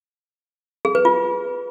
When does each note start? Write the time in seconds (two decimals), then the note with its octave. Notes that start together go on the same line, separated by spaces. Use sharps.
0.85 G#4
0.95 B4
1.05 F4